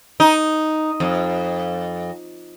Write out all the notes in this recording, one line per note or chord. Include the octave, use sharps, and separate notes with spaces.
D#4
F2